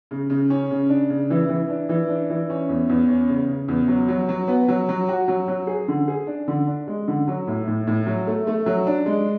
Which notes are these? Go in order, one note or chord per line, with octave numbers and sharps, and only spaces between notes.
C#3
C#3
C#4
C#3
D4
C#3
E3
E3
D4
E3
D4
E3
C#4
E2
E2
C#4
C#3
C#3
E2
F#3
F#3
F#3
B3
F#3
F#3
F#4
F#3
F#3
G#4
D3
G#4
D4
D3
D4
G#3
D3
F#3
A2
A2
A2
F#3
A3
A3
F#3
D4
G#3